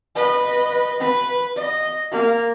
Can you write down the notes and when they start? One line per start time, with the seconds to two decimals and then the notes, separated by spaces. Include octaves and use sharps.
0.15 B4 D#5
1.00 B4
1.56 D#5
2.12 A#3